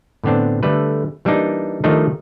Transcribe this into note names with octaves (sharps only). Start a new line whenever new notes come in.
A2 D3 B3 C4 D4
D3 G3 A3 B4
E3 G3 A#3 D4 D#4
D#3 F3 G3 A3 D4 D#4